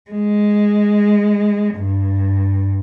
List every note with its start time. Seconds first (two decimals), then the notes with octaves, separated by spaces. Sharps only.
0.11 G#3
1.75 G2